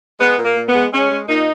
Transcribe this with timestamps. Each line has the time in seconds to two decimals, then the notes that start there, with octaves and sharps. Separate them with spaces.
0.20 G#3 B3
0.38 A#2
0.44 A#3
0.57 A#2
0.68 B3
0.74 G#3
0.92 G#3 C#4
1.11 G#3
1.28 A#2 D#4